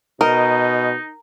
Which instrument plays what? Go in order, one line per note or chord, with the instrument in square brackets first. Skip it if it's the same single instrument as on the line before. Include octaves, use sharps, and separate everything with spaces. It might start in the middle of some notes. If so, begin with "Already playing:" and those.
[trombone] B2 [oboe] D#4 [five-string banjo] A#4 [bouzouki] D#5